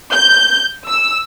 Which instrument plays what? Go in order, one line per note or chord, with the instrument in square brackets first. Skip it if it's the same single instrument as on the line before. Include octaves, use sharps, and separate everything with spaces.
[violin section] G6
E6